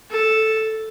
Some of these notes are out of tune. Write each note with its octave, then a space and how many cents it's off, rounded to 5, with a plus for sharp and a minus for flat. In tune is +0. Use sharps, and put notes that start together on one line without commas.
A4 +0